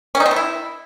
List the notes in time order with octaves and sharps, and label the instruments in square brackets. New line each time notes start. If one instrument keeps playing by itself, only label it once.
[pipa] C#4
D#4
C4
B3
E4